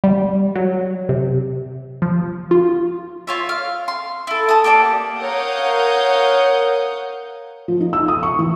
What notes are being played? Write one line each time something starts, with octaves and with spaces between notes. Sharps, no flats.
G3
F#3
C3
F3
F4
F4 C#5 E5
F5
C6
E4 A4
A5 D#6
A#3 G4 A4 D5
A#4 C#5 F5 F#5 D#6 G6
F3
D#4
E6
D#6
C#6
E3